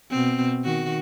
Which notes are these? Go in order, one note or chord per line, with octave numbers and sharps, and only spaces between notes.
B2 C4
D#3 F#4